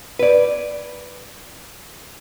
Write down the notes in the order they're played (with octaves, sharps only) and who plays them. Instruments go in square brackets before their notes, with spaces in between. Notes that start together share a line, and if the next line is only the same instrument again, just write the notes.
[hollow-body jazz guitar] B4 D5